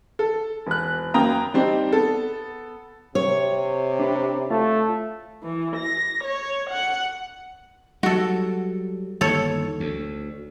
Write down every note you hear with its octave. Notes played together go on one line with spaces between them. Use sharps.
A4
E1 F#6
F#2 A#3 G5 A#5 D#6
G3 C4 D4 D#4
B3 A4
C3 C#5
D4 B4
A3 F4
E3
A#6
C#5
F#5
F#3 G3 F#4 A4
G1 D#2 A4 C#5
D2